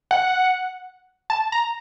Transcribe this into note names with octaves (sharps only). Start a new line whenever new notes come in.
F#5
A5
A#5